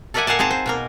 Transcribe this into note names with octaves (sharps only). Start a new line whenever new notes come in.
A4 A#4 D5 E5 F#5 G#5
A#2 A#4 F5 F#5 G#5 A5
C4 D#4 G#4 A5 A#5
C5
B2 A#3 A#4